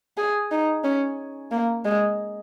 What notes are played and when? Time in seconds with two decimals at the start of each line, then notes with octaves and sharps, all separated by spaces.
0.18 G#4
0.52 D#4
0.84 C#4
1.51 A#3
1.85 G#3